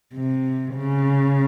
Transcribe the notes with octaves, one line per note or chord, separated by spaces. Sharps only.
C3
C#3